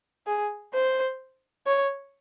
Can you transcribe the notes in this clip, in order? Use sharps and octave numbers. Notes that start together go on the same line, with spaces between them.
G#4
C5
C#5